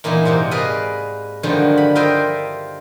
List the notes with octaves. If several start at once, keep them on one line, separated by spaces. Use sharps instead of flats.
A#2 E3 A#3 B3 D#4
G#2 C3 A#3
G#4 B4 D5 D#5 F5
G2 D3 D#3 F3 F#3 G#3
B5
F4 A#4 C5 D#5 E5 G5